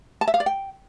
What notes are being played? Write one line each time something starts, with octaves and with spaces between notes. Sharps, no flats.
A5
E5
F5
D5
G5